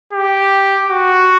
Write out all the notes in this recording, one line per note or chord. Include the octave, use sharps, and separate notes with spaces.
G4
F#4